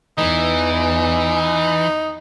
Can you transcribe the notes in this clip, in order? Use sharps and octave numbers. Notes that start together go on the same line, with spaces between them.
E2 E3 D#4